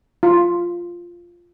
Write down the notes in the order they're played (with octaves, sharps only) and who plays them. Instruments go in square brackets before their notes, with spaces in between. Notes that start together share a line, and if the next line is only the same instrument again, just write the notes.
[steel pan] F4